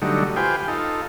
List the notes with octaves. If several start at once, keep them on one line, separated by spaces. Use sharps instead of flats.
D3 F#3 G3 A3 D#4
F4 G4 B4 C5 G5 G#5
D#4 F4 A4